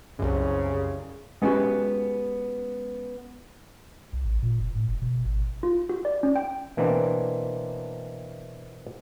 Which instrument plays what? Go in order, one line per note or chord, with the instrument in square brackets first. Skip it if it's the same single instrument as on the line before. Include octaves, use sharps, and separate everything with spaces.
[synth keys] C2 F#2 [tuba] C#3
[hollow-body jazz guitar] G#3 B3 C#4 D4 F#4 G4
[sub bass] C2
A1
A#2
F#1
A2
F#1
B2
G#1
[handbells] F4
F#4
D5
C#4
G5
[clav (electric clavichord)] B2 E3 A#3 C4 D4